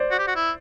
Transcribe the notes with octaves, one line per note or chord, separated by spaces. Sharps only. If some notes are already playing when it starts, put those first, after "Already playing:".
Already playing: C5 D5
F#4
G4
F#4
E4